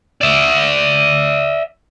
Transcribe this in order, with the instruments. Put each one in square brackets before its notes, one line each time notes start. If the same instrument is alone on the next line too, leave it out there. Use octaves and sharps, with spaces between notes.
[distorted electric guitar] D5 E5